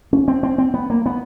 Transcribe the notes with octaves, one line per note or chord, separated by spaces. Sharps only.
C#4
C4
C4
C4
B3
A#3
B3